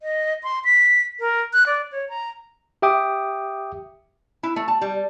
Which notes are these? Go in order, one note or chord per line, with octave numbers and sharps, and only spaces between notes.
D#5
C6
B6
A#4
F#6
D5
C#5
A#5
G4 E5 G5 D6 D#6
E4
A3
A5
G3